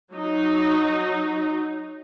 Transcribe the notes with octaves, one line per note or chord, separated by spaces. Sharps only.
F#3 D#4